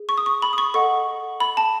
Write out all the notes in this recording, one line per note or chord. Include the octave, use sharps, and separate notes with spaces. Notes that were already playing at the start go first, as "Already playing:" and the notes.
Already playing: G#4
C#6
D#6
C#6
B5
D#6
C#6
A4 D#5 F#5 C#6
B5
A5